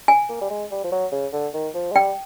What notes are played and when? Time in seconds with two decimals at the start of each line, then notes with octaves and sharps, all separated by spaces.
0.08 G#5
0.29 A#3
0.41 G3
0.51 G#3
0.71 G3
0.85 F3
0.92 F#3
1.12 C#3
1.33 D3
1.54 D#3
1.75 F3
1.92 G#3
1.96 G3 G5